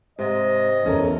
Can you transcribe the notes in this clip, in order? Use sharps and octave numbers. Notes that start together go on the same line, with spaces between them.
G#2 C3 D#5
E2 C#4 A4 A#4